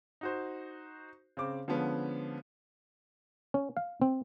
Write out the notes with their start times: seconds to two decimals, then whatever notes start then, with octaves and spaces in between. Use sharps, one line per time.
0.21 D#4 F#4 C5
1.37 C#3 C4 D6
1.68 D3 F3 G#3 B3 C#4
3.54 C#4
3.77 F5
4.02 C4